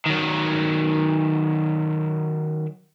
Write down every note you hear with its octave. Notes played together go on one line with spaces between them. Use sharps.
D#3 F#3